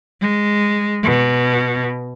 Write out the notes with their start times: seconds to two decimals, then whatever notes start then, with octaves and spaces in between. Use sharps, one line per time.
0.21 G#3
1.03 B2